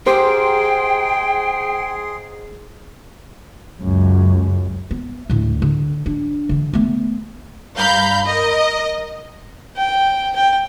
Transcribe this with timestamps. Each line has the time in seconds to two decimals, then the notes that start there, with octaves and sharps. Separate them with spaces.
0.06 G#2 G4 G#4 C5 G5 C6
3.81 C#2 F#2
4.91 B3
5.30 D2 A2
5.62 D3
6.06 D4
6.49 D3 E3
6.73 A3 B3
7.76 G2 F5 A#5 B5 G6
8.26 A#4 D#5
9.77 G5
10.36 G5